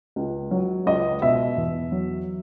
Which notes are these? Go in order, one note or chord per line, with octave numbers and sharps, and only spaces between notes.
C#2
F#3
C#2 D#5
B2 E5
E2
F#3